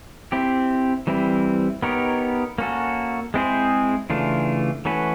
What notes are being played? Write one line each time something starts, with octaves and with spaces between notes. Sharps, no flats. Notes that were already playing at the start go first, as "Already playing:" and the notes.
C4 E4 G4
E3 G3 C4 E4
B3 D#4 G4 A#4 C#5
A#3 C#4 F#4 A4
G#3 C4 E4 G#4 C5
C#3 E3 A3 D4 F4
E3 A3 C#4 F#4 B4